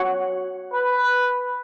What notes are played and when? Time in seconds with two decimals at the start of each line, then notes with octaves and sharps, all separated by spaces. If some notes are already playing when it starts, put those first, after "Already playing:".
Already playing: F#4 C#5 F#5
0.74 B4